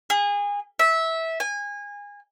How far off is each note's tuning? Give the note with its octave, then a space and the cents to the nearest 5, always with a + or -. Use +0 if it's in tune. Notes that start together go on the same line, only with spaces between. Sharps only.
G#4 -30
E5 -15
G#5 -25